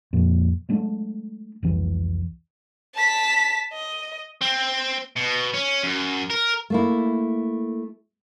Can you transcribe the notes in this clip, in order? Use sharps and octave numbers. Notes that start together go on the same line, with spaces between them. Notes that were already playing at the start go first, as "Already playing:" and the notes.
F2 A#2
F#3 G#3 A3 D4
F1 C2 E3
A5 B6
D#5
C4
B2
C#4
F#2
A#4
A3 A#3 E4